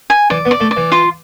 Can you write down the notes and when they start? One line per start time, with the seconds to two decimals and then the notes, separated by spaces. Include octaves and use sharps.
0.10 G#5
0.30 E3 D5
0.45 B3
0.51 D5
0.60 A3
0.71 D5
0.77 E3
0.92 F4